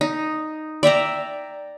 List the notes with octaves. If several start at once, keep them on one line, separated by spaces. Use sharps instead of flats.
D#4
D5 E5 G5 A#5